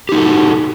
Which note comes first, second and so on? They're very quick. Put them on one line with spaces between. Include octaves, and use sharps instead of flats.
G4 D#4 F#4 A4